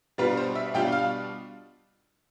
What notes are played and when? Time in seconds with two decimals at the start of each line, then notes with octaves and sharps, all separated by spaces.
0.18 B2 G3 D4 F4 B4
0.37 C5
0.55 E5
0.74 B2 G3 D4 F4 G5
0.92 F5